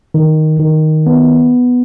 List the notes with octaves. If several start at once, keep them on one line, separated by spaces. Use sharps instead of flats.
D#3
D#3
B3